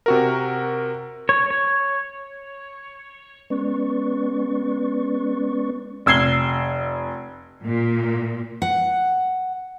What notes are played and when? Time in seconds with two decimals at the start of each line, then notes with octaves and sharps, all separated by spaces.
0.06 C3 F#4 A#4
1.29 C#5
1.51 C#5
3.50 G#3 B3 C#4 B4 D5 C#6
6.06 F1 E6 G#6 C7 G7
7.62 A#2
8.62 F#5